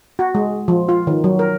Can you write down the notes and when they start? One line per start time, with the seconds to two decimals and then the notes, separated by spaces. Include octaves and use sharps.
0.19 F#4
0.35 G#3
0.68 F3
0.89 F4
1.07 D#3
1.24 F#3
1.39 A#4